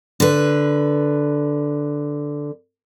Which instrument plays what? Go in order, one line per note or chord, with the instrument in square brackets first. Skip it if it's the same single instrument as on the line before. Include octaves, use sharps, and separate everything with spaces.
[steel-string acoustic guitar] D3 B4